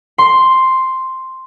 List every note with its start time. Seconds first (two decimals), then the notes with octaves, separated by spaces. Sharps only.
0.18 C6